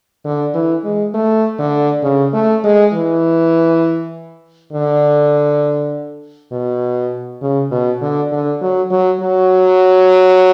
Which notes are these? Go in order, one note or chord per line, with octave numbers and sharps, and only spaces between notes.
D3
E3
G#3
A3
D3
C#3
A3
G#3
E3
D3
B2
C#3
B2
D3
D3
F#3
F#3
F#3